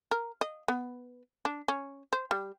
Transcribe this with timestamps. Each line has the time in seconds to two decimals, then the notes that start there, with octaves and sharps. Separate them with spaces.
0.11 A#4
0.41 D#5
0.68 B3
1.45 D4
1.68 C#4
2.13 C5
2.31 G3